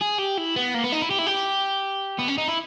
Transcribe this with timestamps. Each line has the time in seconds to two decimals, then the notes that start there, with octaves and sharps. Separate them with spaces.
0.02 G#4
0.19 G4
0.38 E4
0.56 B3
0.75 A#3
0.84 B3
0.92 D#4
1.02 E4
1.11 G4
1.19 E4
1.27 G4
2.19 B3
2.28 C#4
2.38 D#4
2.48 E4